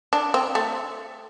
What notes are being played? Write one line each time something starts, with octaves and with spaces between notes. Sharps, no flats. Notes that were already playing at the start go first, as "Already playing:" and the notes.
D4
C4
A3